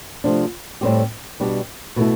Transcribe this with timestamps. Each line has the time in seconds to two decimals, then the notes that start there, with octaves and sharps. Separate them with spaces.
0.24 C3 F3 A3 D4
0.81 A2 G3 C4 G4
1.40 B2 G3 D4 G4
1.96 B2 A3 E4